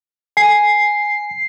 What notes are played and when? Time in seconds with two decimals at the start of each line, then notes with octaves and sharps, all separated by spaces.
0.37 G#5 C7